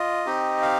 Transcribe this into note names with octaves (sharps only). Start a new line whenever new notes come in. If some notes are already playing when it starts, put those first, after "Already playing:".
Already playing: F4 D#5
C4 D#4 G4
F5